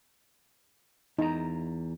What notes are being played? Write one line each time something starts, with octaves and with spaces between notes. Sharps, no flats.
E2 D#4 A#5